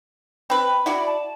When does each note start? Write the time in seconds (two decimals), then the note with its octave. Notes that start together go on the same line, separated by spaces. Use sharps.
0.50 C4 B4 B5
0.86 E4 F#4 D5
1.06 A5